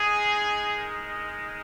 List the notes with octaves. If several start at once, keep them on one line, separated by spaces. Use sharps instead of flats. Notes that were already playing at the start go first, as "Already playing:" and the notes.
Already playing: G#3 D#4 G#4
A#4